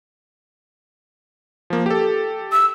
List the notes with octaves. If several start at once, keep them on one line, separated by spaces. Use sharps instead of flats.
F3 A#3
G4 A4
E6